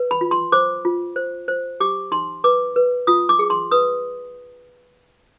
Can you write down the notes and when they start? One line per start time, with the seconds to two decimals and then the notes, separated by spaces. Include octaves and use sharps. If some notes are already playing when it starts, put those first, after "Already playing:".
Already playing: B4
0.11 B5
0.21 F4
0.31 C6
0.52 C5 D6
0.85 F4
1.16 C5
1.48 C5
1.80 G4 D6
2.12 D#4 C6
2.44 B4 D6
2.76 B4
3.07 F4 D#6
3.29 D6
3.39 G#4
3.50 C6
3.71 B4 D#6